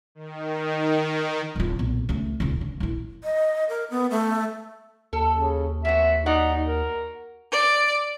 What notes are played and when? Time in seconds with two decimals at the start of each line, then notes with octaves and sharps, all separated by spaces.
0.15 D#3
1.56 D1 F4
1.79 B1 A#2
2.09 C#2 A3
2.40 D#1 C#2
2.61 D3
2.80 A#1 E4
3.24 D#5
3.69 A#4
3.91 B3
4.11 A3
5.13 D#2 A4
5.33 C#3
5.85 F2 B3 F#4 E5
6.26 D#4 F#4 D5 F#5
6.67 A#4
7.51 D5